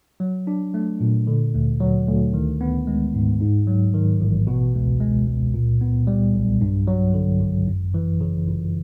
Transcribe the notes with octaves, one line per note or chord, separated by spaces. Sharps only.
F#3
D4
A3
A#2
D3
D2
F#3
D2
D#3
B3
G#3
G#2
G#2
F#3
D#3
A1
B2
C#2
G#3
C#2
A#2
B3
G3
B1
G2
F#3
D3
G#1
F#2
E3
C#3
G1